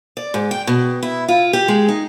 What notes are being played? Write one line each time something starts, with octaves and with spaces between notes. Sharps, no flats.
D5
G#2
G5
B2
E4
F4
G4
G#3
D#4